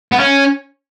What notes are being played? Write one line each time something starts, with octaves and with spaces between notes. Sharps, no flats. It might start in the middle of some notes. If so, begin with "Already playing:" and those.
B3
C#4